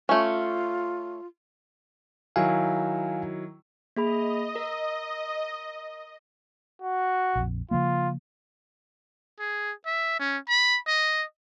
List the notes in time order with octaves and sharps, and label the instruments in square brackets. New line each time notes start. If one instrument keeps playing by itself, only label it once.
[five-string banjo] A3 C#4 [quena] F4
[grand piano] D#3 F#3 E4 [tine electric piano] F5 G#5
[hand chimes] A#3 G#4 B5 [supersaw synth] D#5
[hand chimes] A#4
[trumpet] F#4
[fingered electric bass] A#1 F2
[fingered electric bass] C#3 F3 A#3 [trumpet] F4
[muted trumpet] G#4
E5
C#4
B5
D#5